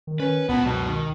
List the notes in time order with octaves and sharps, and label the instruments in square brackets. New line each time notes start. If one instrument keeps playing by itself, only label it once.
[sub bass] D#3
[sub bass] D#3 [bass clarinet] C#4 [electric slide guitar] B4
[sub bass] C#2 [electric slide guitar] A#2 A5 [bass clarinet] B3
[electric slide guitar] F#2 B3 D#4 [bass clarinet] B2
[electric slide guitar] D#3